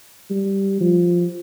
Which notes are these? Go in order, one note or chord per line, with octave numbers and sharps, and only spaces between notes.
G3
F3